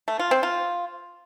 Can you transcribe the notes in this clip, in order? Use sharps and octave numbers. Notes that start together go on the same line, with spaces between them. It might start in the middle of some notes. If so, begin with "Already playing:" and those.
A3
F4
C4
F4